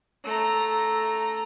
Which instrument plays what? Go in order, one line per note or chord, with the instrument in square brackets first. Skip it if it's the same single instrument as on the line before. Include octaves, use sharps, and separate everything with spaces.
[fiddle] A3 A#5